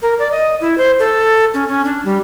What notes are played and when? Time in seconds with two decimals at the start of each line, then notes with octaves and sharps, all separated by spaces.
0.02 A#4
0.19 D5
0.31 D#5
0.61 E4
0.78 C5
0.99 A4
1.54 C#4
1.68 C#4
1.85 D4
2.05 G3